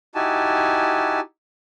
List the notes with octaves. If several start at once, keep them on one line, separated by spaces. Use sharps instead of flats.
D#4 E4 F#4 G4 G#5 A5